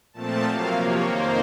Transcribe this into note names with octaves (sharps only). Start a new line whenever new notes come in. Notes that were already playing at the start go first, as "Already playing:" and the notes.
A#2 F3 A3 C4 A5
C3 F#3 A#3 F5
C3 F3 A#3 C#5
F2 D#3 A#3 C5